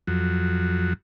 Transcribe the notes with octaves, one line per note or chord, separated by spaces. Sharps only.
F2 F#3